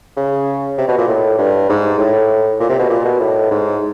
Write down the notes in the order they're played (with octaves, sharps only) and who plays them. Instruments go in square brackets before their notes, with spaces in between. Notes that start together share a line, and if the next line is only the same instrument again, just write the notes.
[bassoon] C#3
C3
B2
A#2
A2
G2
G#2
A2
A#2
C3
B2
A#2
B2
A2
G#2